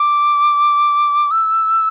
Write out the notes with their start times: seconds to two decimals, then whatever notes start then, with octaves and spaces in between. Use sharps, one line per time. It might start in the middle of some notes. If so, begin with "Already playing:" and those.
Already playing: D6
1.31 E6